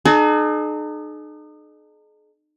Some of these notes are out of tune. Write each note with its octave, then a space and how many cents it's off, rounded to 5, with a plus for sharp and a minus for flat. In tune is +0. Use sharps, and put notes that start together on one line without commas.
D#4 -40 G#4 +45